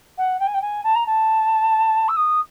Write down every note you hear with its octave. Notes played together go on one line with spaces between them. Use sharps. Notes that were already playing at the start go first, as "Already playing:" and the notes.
F#5
G5
G#5
G5
G#5
A5
A#5
A5
E6
D#6